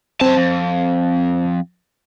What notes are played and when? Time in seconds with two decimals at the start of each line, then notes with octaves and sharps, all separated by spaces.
0.21 F#2 C4 C5 A5
0.37 F2